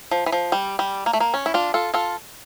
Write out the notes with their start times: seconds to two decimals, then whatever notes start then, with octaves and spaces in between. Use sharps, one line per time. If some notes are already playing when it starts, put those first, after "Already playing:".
0.11 F3
0.26 E3
0.32 F3
0.52 G3
0.79 G3
1.06 A#3
1.13 A3
1.20 A#3
1.34 C#4
1.46 E4
1.54 D4 F4
1.74 F4 A4
1.94 F4 A4